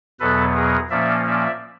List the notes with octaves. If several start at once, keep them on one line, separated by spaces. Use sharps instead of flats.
E2 B2 F#3 B3 A4 B4
G#4 A#4
A#2 F3 A#3 C#4 D5 E5
D5 E5